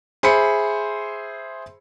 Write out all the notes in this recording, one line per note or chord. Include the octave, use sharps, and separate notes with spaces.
G#4 C5 E5 B5 C#7